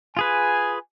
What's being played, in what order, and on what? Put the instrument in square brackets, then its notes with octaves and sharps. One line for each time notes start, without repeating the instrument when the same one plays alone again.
[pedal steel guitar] F4 G#4 B4 [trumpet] G#5